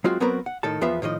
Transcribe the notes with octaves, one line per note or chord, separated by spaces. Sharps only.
F#3 G#3 C4 F4 F#4
F#3 B3 C4 F#4 A#4 B4
F#5
A2 D#3 A4 A5
E2 F3 B3 F4 B4 E5
A2 D#3 F3 D#5